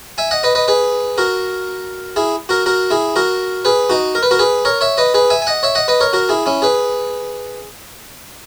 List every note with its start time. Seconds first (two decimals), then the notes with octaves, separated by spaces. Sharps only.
0.18 E5 G#5
0.31 D#5 F#5
0.43 B4 D#5
0.55 B4 D#5
0.68 G#4 B4
1.18 F#4 A#4
2.16 E4 G#4
2.49 F#4 A#4
2.66 F#4 A#4
2.91 E4 G#4
3.16 F#4 A#4
3.65 G#4 B4
3.90 D#4 F#4
4.15 A#4
4.23 B4
4.31 F#4 A#4
4.39 G#4 B4
4.65 A#4 C#5
4.81 C#5 E5
4.98 B4 D#5
5.14 G#4 B4
5.30 E5 G#5
5.42 G#5
5.47 D#5 F#5
5.63 C#5 E5
5.75 D#5 F#5
5.88 B4 D#5
6.01 A#4 C#5
6.13 F#4 A#4
6.29 E4 G#4
6.46 C#4 E4
6.62 G#4 B4